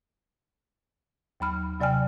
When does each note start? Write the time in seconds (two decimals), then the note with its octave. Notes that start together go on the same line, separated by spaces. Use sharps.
1.40 D#2 F#3 B5 F6
1.80 C3 F#3 D5 G5 G#5 F6